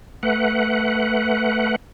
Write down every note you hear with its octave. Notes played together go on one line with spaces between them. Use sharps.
A3 B4 F#5